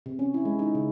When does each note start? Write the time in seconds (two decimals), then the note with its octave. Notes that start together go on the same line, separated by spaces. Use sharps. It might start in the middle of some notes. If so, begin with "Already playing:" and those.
0.06 C3
0.19 C#4
0.34 E4
0.45 G#3
0.59 D#4
0.75 C#3